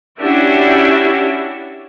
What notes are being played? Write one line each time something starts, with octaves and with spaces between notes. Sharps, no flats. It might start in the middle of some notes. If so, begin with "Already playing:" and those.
C#4 D4 E4 F#4 G4 E5